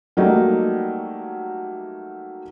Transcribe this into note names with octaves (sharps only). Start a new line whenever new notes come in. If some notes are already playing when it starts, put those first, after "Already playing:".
F#3 G3 A3 A#3 D#4